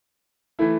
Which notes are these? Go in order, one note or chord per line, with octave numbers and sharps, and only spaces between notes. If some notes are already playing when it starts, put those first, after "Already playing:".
E3 A3 E4